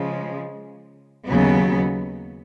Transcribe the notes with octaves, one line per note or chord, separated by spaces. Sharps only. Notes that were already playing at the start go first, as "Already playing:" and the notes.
Already playing: C#3 F3 G#3
D#2 C#3 F#3 B3